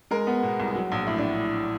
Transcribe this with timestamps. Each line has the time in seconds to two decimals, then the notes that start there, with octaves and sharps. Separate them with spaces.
0.11 G#3 A#4
0.27 B3
0.43 B2
0.60 C2
0.75 F#3
0.92 A#1
1.07 A2 E4
1.18 D4